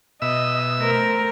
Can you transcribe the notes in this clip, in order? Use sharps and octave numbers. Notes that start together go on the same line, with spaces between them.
B2 D#5 E5 E6
A3 A#4 C5